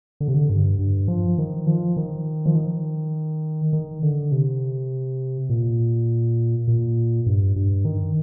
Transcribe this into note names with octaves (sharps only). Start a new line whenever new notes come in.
D3
C3
D3
G2
G2
F3
D#3
F3
D#3
F3
D#3
D#3
D3
C3
A#2
A#2
G2
G2
D#3